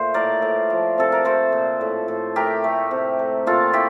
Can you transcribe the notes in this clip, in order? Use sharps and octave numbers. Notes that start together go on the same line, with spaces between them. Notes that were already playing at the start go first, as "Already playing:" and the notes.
Already playing: A#2 A3 C5
A2 A#4 D5
A2
F3
C3 A4
A#4
A3 A4 C5
A#2
A2
A2
A3 G4 A#4
A3
C3
A3
A#2 F4 A4
A3 E4 G4